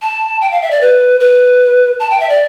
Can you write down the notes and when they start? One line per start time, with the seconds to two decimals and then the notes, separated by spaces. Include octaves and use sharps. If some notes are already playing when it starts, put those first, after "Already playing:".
0.02 A5
0.41 G5
0.51 F5
0.62 E5
0.71 D5
0.81 B4
1.20 B4
2.00 A5
2.10 G5
2.20 E5
2.29 D5